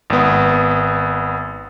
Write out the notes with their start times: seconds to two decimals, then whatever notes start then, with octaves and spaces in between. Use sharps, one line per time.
0.10 G#1 B3